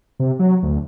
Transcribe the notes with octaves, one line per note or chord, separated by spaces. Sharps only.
C3
F#3
D2